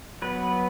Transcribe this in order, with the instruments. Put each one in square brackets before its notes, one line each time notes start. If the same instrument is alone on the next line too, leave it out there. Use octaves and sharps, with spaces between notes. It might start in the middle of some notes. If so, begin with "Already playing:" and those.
[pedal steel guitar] F#3 B3 B4